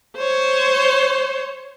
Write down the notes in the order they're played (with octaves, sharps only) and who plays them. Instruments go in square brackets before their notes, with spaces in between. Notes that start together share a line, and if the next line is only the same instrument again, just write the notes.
[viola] C5 C#5